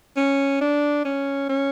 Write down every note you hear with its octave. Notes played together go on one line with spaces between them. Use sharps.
C#4
D4
C#4
C#4